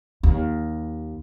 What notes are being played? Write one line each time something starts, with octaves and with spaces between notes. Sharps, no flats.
D#2